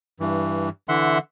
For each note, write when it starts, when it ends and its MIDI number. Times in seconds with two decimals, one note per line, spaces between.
0.20 0.69 43
0.20 0.69 52
0.89 1.18 50
0.89 1.18 52
0.89 1.18 76
0.89 1.18 78
0.89 1.18 84